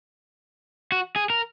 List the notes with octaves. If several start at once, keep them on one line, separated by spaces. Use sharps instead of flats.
F#4
G#4
A#4